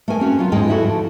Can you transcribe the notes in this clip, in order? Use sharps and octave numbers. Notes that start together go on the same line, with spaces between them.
A3 G#4 A#4 G#5
C4 C#4 F#4
F#3 F4
E2 G#2 G#3 D#4 G5 G#5
D2 E4 F#4 A4
F3